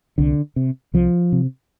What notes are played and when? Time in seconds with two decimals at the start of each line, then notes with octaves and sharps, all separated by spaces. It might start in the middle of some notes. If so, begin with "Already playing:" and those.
0.18 C2 D3
0.56 C3
0.94 C2 F3
1.32 C3